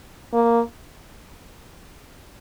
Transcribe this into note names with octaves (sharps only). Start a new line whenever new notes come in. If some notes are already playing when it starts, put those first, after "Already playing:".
A#3